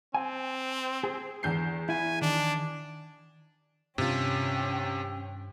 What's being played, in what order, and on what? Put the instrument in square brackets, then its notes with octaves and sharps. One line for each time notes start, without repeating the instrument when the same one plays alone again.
[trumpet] C4 [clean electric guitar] G#5
[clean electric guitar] G#4
[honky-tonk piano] E2 G6 C7
[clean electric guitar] E4 [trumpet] G#5
[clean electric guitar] D#3 [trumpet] D4
[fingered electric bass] G2 D#3 D4 [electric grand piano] C3 F4 [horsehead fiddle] C#4 G5